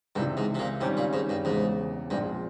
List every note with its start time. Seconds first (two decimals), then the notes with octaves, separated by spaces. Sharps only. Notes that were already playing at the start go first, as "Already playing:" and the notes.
0.16 C#2 G2 C3 E3
0.37 G#2
0.55 C3
0.59 A#2
0.81 G#1 G#2 C3 G3 C#4 G4
0.97 A#2
1.13 G#2
1.29 G2
1.45 E1 E2 G#2 C#3
2.10 A#1 G2 A#2 F3 G#3 C4